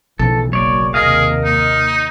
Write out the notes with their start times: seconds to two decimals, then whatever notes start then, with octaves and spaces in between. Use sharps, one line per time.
0.19 B1 C#3 E3 F3 A4
0.53 F#1 F#3 A#3 C#5 D5
0.94 D#2 C3 A#3 G#4 A#4 D#5 F5
1.45 D#4